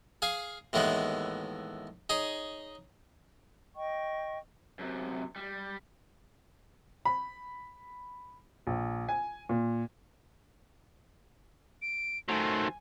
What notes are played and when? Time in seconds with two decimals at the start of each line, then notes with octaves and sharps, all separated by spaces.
0.22 G#4 F5 G#5
0.73 D#2 A2 E3 G#3 B3
2.10 D#4 G#4 C#5
3.76 D#5 G5 C#6
4.79 F#2 C3
5.36 G3
7.05 B5
8.67 A#1
9.09 G#5
9.49 A#2
11.82 D7
12.29 D#3 F#3 A3 C5 G#5